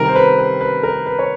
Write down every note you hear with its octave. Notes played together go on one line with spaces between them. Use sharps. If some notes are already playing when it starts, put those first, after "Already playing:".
Already playing: C3 D#3 G3 A#4
C5
B4
B4
B4
A#4
B4
C#5